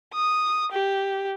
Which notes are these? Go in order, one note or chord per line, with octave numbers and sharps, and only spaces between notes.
D#6
G4